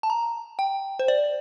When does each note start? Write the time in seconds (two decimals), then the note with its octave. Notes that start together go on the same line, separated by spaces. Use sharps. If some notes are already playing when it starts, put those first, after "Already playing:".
0.03 A5
0.10 A#5
0.59 G5
0.99 C5
1.08 D5